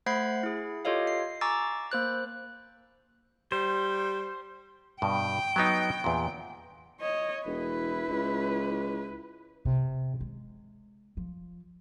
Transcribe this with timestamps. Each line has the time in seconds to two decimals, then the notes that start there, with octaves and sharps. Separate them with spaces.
0.06 A3 C5 F#5 B5 G#6 C7
0.43 E4 G#4
0.85 F4 G4 A4 C#5 D#5 F5
1.07 C7
1.41 G#5 A#5 C#6 D6 E6 A6
1.92 A#3 C5 F#6
3.52 G3 C5
5.02 G2 B2 G5
5.56 F#3 B3 D#4
6.04 E2 A#2
7.00 C#5 D#5
7.46 E1 E4 B4
8.09 C#2
9.65 C3
10.21 G#3
11.17 F3